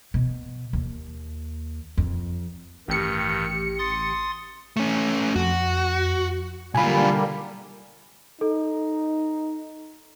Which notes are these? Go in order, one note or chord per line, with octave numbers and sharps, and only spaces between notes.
B2
D#2
F2
A1 G2 D#3 G4 C#7
C6 D#6 A6
A3 C#4
F2 F#4
B1 D3 G3 A#3 F4 G#5 B5
D#4 A4